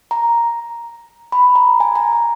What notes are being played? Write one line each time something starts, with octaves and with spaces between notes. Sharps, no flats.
A#5
B5
A#5
G#5
A#5
G#5